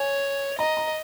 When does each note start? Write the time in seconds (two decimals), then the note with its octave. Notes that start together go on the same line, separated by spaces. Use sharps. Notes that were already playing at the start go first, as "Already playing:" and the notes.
Already playing: C#5 G#5
0.58 D#5 A#5
0.77 A#5